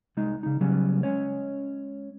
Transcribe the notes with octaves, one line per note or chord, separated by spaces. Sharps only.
C2 G#3 D#4
C#3 D#4
C#3 F#3 G3 B3 C#4
G#3 C#4 C#5